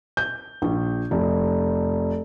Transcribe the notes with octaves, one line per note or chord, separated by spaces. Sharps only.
G6
A#1
F1